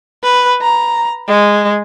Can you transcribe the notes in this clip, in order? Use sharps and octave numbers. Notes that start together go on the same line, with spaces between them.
B4
A#5
G#3